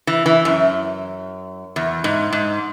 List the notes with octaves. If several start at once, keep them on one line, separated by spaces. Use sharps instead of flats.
E3
E3
F#2
E2
G#2
G#2